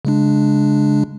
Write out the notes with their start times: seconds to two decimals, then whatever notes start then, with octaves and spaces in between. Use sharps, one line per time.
0.05 C#3 G#3 D4